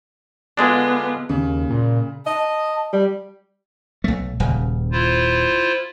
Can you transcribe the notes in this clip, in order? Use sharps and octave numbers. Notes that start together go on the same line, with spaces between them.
D3 G#3 B3 D4 F4
D#2 C#3
A#2
D#5 A5
G3
B1 A3
D#1 C#3
E4 F4 C5